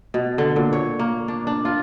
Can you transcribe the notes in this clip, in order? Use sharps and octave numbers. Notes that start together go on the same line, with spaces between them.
B2
D3
A#2
C#5
A#3
D4
D4
F4